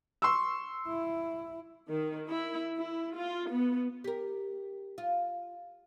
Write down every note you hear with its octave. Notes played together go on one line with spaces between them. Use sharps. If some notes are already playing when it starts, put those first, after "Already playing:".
C6 C#6 E6
E4
D#3
E4
E4
F4
B3
G4 A#4
F4